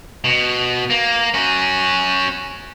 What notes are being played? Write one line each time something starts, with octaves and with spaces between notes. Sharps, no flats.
B2
A#3
C#4 F#4